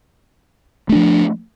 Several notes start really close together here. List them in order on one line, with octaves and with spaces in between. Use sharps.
A3 D4 F3